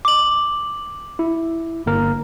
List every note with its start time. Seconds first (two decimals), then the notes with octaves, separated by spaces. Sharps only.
0.05 D6 F#7
1.19 E4
1.86 G1 A#3 A#4